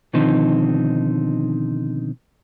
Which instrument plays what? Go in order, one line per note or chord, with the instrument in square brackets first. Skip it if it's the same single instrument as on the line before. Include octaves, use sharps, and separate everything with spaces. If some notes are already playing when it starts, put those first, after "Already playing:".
[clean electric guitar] B2 D3 D#3 F3 C4 D#4